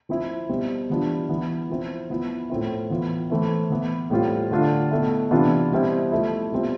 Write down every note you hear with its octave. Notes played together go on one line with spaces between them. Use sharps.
F3 C4 E4
B2 G3 C4
E3 G3 B3 D4 F4
E3 B3 E4
F3 C4 E4
F3 B3 E4
A2 F3 C4 E4
E3 B3 F4
E3 A3 C4 E4
E3 B3 E4
A2 G3 C4 F4
D3 A3 D4 F4
B2 A3 E4
C3 E3 B3 D4 F4
B2 G3 C4 E4
F3 A3 E4
B2 G3 C4 F4